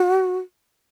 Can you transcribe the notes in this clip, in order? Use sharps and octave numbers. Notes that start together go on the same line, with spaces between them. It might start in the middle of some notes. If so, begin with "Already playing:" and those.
Already playing: F#4